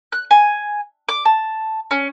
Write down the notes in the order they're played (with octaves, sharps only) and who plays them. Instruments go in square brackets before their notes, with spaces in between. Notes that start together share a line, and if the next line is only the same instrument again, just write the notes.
[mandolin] F#6
G#5
D6
A5
C#4